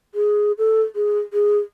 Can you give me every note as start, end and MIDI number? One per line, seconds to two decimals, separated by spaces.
0.15 0.52 68
0.58 0.82 69
0.95 1.19 68
1.33 1.58 68